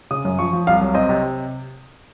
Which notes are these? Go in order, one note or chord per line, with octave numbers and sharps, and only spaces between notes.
C#3 D#6
F#2
F3 C#6
F3
C2 F5
F#3
C4 D#5
C3